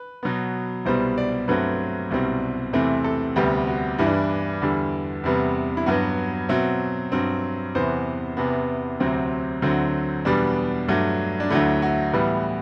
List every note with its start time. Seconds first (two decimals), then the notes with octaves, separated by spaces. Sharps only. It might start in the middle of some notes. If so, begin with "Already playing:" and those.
Already playing: B4
0.23 B2 F#3 B3
0.85 C2 B2 G3 B3 C5
1.18 D5
1.48 G2 F#3 A3 C4 B4
2.11 C2 B2 G3 C4
2.73 E2 C3 E3 A3 C4
3.04 A4
3.36 D2 C3 G3 B3 G4
3.67 F#4
3.98 G2 E3 G3 E4
4.06 D4
4.13 E4
4.62 E2 D3 G3
5.24 E2 C3 G3 B3
5.77 E4
5.86 G2 F#3 B3 F#4
6.49 B2 F#3 C4 E5
7.12 G2 F#3 C4
7.75 E2 C3 E3 B3 C5
8.37 E2 C3 E3 B3
9.00 D2 C3 F#3 C4
9.62 D2 D3 F#3 C4
10.25 E2 B2 G3 B3 D4
10.88 G2 F#3 A3
11.40 D4
11.50 D2 D3 F#3 A3 E4
11.82 F#4
12.13 A2 E3 G3 B3